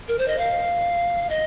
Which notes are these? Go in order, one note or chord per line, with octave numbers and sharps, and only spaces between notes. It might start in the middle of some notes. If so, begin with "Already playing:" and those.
A#4
C5
D#5
F5
D#5